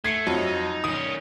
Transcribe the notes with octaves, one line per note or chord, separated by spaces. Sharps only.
A3 G#6 C7 C#7
F2 F#3 D#4
D#3 C#4 D#6